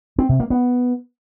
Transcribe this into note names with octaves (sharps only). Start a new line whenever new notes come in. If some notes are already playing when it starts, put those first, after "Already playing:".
C4
C3
A#3
B3